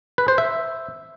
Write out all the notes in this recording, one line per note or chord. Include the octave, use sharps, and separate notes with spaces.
B4
C5
E5